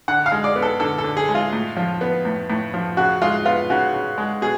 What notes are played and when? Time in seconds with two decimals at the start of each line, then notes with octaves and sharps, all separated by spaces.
0.08 D3 F#5
0.26 F5
0.32 G#3
0.44 D5
0.56 B3
0.62 A4
0.80 D3 A4
0.98 A4
1.04 D3
1.17 G#4
1.29 G#3
1.35 F4
1.53 A2
1.77 F3
2.01 B3
2.25 A2
2.50 A2
2.74 F3
2.97 C#3 F#4
3.22 G#3 F4
3.45 B3 F4
3.70 C#3 F#4
3.93 C#3
4.18 G#3
4.42 B2 G#4